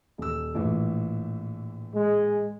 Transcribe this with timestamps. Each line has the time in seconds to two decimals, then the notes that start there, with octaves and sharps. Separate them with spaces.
0.18 D#1 E6
0.55 A#1 A2 E3
1.95 G#3